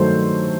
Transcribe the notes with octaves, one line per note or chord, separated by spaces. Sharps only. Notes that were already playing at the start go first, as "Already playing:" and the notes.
Already playing: G2 D#3 F#3 A3 A4 C5